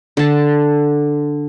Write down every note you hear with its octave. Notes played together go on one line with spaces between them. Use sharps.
D3 A5